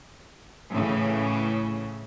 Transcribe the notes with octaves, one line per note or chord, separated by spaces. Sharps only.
A2 C#3 E3